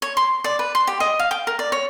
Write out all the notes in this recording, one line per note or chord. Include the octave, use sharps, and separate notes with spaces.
C#5
C6
D5
B4
C6
G4
D#5
F5
G5
A#4
D5
C#5